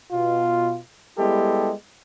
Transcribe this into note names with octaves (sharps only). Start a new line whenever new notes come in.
B2 F4
G3 G#3 B3 E4 G4 A4